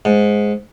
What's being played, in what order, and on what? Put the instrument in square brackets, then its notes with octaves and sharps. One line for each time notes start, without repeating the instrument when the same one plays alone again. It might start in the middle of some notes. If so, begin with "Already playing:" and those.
[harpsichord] G#2